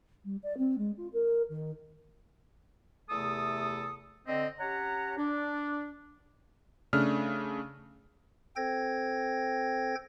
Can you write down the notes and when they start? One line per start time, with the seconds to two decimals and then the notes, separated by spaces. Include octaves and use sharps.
0.25 G3
0.43 D5
0.58 C4
0.78 G#3
0.97 F4
1.13 A#4
1.49 D#3
3.10 E2 C3 A3 A4 D#6
4.27 D3 C4 D#5
4.60 C#4 G4 C#5 F#5 A#5
5.18 D4
6.93 C#3 A3 D4 F6
8.56 C4 A4 C5 G5 G#6 A#6